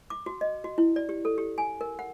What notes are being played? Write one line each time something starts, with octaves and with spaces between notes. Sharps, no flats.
D6
F#4
D#5
F#4
E4
D5
G4
A4
G4
G#5
A#4
F#5